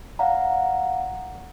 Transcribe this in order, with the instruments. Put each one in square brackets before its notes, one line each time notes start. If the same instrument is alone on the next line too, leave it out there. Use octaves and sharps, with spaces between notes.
[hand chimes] D5 F5 F#5 A#5